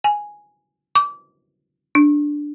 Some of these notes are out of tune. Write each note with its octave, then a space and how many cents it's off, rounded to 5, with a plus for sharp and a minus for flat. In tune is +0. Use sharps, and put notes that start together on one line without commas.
G#5 +0
D6 -25
D4 +0